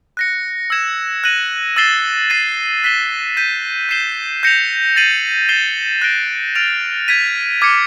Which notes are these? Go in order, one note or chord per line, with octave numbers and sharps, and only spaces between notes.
F#6 A#6 C#7
E6 G#6 C#7 E7
F#6 A#6 D#7 F#7
E6 A6 C7 E7 G7
A6 C7 D#7
F#6 B6 E7 G7
G6 B6 D#7
G6 C7 E7 G7
G6 A#6 C#7 F7
A6 C7 D#7 F#7
A6 C7 E7 G7
F#6 A#6 D7 G7
F6 A6 D7 F7
G#6 B6 D#7
D6 F6 G#6 C#7